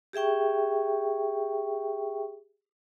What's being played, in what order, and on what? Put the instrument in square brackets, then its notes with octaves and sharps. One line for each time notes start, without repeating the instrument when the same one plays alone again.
[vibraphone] G4 G#4 E5 G5 C#6